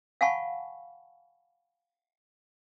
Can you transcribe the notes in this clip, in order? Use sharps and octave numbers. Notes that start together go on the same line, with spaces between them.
F5 F#5 G#5 A5 B5 C#6